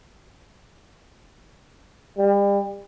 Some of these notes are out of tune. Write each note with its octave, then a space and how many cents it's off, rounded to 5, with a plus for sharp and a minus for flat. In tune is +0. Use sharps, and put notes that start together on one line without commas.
G3 +35